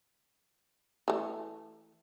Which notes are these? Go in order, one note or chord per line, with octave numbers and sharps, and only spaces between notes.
E3 A3